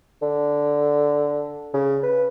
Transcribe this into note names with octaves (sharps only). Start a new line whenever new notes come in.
D3
C#3
B4